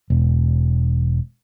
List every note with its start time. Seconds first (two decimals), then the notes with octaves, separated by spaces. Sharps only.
0.10 E1